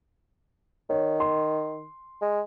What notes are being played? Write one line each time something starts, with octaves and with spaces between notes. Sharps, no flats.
D#3 C#5
C6
G#3